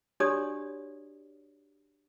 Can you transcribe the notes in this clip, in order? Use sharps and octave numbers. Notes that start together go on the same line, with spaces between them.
D4 F#4 G4 C#5 D5 D#6